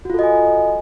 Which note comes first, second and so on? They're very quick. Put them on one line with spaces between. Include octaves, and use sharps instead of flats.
F#4 F4 A4 D#5 G#5